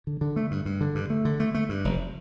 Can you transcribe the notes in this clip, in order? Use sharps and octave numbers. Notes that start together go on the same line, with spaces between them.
D3
D3
A3
G2
G2
D3
G2
A3
D3
A3
A3
G2
F1